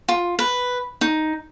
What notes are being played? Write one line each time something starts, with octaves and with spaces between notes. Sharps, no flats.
F4
B4
D#4